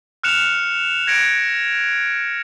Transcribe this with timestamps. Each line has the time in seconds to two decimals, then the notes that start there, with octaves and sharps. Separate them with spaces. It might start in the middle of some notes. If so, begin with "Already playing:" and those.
0.23 F6 F#6 C#7 E7 F7
1.07 G#6 A#6 C#7 D7